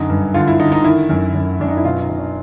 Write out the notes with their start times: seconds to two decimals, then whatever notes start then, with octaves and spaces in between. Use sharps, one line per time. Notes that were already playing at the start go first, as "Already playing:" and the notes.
Already playing: F#2 D3 D#4
0.10 G2
0.34 D3 F4
0.47 E4
0.59 D3 D#4
0.72 D#4
0.84 D#3 E4
1.09 F#2
1.34 F#2
1.60 F#2 D4
1.68 D#4
1.77 E4
1.84 B2 F4
2.01 D#4
2.10 B2
2.18 D4